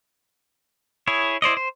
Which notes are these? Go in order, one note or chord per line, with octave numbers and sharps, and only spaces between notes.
E4 G#4 C#5
E4 C5 D5 D#5
C5